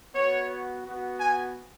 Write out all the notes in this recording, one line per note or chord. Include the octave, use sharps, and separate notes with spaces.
B3 F#4 C#5
B3 F#4
G#5